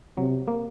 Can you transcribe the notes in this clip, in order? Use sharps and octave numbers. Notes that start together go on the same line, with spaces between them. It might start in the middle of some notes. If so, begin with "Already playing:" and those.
C3 F#3
A#3